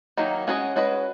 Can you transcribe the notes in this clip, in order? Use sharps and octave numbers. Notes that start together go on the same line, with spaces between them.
D#3 F#3 A#3 D#4
G#3 C#4 F#4 B4 D#5
G#3 C#4 F#4 B4 D#5